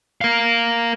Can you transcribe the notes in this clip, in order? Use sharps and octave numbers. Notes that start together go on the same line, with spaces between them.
A#4 F5